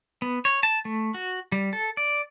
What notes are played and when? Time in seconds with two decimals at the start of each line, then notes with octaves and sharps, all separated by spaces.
0.22 B3
0.45 C#5
0.63 A5
0.85 A3
1.14 F#4
1.52 G3
1.73 A4
1.97 D5